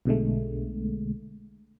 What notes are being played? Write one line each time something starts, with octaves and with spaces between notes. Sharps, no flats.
B1 B2 D3 G#3 A3